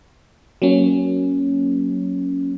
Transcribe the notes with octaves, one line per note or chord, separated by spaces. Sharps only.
F#3 A#3 C#4